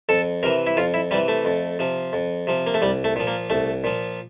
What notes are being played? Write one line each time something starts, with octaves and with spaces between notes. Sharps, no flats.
F2 A4
C3 E3 A#4
E4
F2 F4
E4
C3 E3 G3
A3
F2
C3 F3
F2
C3 F3
A#3
A3
C2 G3
A3
A#2 F3
A#3
C2 A3
A#2 F3